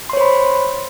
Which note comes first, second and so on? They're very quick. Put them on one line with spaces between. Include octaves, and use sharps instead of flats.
C6 C#5 C5 B5